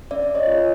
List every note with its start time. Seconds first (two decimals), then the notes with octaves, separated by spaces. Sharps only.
0.11 C#4 D5 E5
0.35 C#5 D#5
0.47 F4 G#4